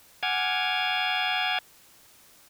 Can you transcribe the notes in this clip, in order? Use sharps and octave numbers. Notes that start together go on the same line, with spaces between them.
F#5 G#5 D6 F6 G#6